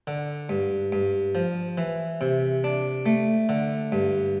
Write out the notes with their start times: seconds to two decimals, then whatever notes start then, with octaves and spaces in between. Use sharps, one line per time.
0.07 D3
0.49 G2
0.92 G2
1.35 F3
1.78 E3
2.21 C3
2.64 D4
3.06 A3
3.49 D3
3.92 G2